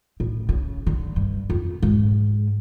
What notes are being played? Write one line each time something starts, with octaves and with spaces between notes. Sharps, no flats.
A2
C#3
D3
G2
F2
G#2